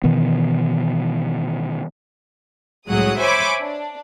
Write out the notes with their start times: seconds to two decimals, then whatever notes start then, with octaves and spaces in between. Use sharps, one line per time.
0.03 B2 D#3 E3 B3
2.89 C2 A2 F#3 G#3 F#5 D#6
3.20 C5 C#5 E5 G#5 B5 D6
3.59 D4